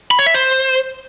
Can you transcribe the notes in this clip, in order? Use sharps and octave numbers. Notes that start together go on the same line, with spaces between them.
B5
C#5
E5
C5